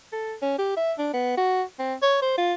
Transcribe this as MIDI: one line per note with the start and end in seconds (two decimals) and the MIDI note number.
0.12 0.35 69
0.42 0.57 61
0.58 0.74 67
0.77 0.92 76
0.98 1.11 62
1.13 1.36 59
1.37 1.62 66
1.79 1.94 60
2.02 2.19 73
2.22 2.34 72
2.38 2.54 65